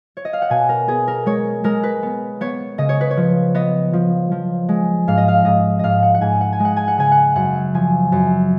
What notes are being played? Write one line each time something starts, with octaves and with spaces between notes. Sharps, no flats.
C#5
D#5
F5
F#5
B2 G#5
A#4
B3 G#4
A#4
G#3 C#5
G#3 A#4
B4
B3
B3 C#5
C#3 D#5
C#5
B4
C#5
F3
B3 D#5
F3
F3
G#3
G#2 F5
D#5
F5
G#2 D#5
G#2 D#5 F5
F#5
F#5
G#2 G#5
F#5
G#5
G#3
F#5
G#5
F#5
C#3 G#5
F#5
F#2 F#5
F3 G#5
F#2